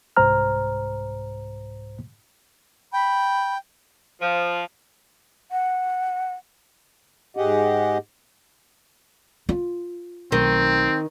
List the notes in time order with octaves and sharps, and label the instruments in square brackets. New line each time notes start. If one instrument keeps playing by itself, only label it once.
[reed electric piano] C2 G#2 C5 A#5 F6
[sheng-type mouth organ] G5 [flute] B5
[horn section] F3
[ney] F#5
[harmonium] G#2 G4 G#4 D#5 F#5
[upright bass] F4
[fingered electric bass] B1 A3 [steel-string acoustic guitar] D#3 [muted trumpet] C4